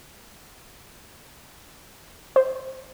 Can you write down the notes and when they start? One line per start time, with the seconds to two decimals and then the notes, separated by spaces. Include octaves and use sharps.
2.36 C5